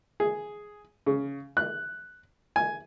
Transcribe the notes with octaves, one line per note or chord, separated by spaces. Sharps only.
G#4
C#3
F#6
G#5